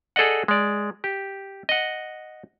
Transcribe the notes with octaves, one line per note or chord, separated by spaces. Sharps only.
G#4 A4 D5 D#5 F#5
G#3 D5
G4
D#5 F#5